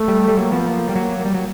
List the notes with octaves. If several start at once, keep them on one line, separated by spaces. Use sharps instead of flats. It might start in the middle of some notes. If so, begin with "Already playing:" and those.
Already playing: A3
G3
G3
F#3 A#3
F3 B3
A#3
G3
F#3
G3
F#3